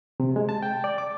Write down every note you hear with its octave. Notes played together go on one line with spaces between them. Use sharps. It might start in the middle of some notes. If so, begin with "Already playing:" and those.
C3
G#3
A5
G5
D5
D6